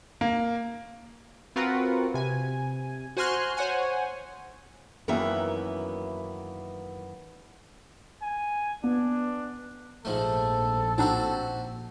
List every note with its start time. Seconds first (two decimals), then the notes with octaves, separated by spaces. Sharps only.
0.21 A#3
1.56 C4 F4 F#4 A#4 B4 F#5
2.14 C3 G#5
3.17 F#4 C5 G#5 C6 F6 F#6
3.57 C5 C#5 F#5 G#5
5.08 F#2 D#3 E3 A#3 B3 E5
8.23 G#5
8.84 B3 D4
10.05 A#1 G#2 F3 A3 A4
10.98 A2 C4 D4 D#4 F#4 G4